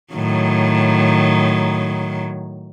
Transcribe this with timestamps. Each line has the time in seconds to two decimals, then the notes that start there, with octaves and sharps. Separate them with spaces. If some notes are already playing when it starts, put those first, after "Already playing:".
0.14 A2 D#3 F#3